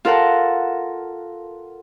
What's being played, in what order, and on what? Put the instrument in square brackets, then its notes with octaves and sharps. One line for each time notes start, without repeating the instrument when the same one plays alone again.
[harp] F4 A4 A#4 F#5 A5